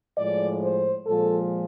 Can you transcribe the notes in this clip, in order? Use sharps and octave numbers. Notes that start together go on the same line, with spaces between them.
A2 F3 G#3 D5
C5
A#2 F3 G#3 A4